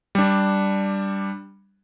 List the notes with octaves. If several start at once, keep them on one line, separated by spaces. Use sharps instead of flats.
G3 D4